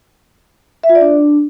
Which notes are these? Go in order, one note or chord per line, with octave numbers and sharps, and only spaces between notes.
E5
F4
D5
D4